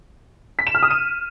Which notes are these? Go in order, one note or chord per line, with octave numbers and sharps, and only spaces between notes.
B6
E7
F6
D#6
D#7